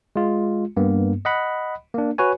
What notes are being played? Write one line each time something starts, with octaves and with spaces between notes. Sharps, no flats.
G#3 F4
G2 A#3 B3
D#5 F#5 B5
A#3 D4
F#4 B4 C#5 G#5